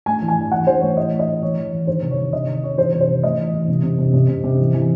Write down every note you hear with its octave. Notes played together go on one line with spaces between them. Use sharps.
A2 G#5
E3
G#5
E3
E3 F#5
E3 C5
A2 C#5
E3 D#5
A2
D#5
A2
E3 C#5
E3
E3
D#3 C5
C3
C#5
D#3
C3 D#5
D#3
D#3 C#5
E3 C5
C3
C5
C3
A2 D#5
E3
E3
C3
C3
C3
C3
C3
C3
E3
E3